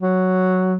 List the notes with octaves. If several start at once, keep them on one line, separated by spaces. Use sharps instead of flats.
F#3